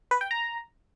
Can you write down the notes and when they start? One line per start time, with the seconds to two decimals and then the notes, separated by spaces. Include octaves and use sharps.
0.11 B4
0.21 G5
0.31 A#5